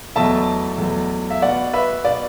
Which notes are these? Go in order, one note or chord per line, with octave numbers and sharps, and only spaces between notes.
E2 B2 F#3 A3 E5 A5
E2 B2 F#3 A3
E5
B2 B3 D5 F#5
B4 E5
B2 B3 D5